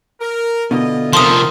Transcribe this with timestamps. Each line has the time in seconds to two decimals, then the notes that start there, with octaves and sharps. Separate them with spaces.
0.21 A#4
0.71 B2 D3 E4 F4 D#5
1.13 C3 F3 A#4 A5 C6 D#6